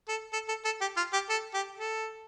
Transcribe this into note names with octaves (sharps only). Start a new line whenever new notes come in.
A4
A4
A4
A4
G4
F4
G4
A4
G4
A4